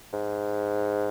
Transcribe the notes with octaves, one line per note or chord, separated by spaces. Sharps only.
G#2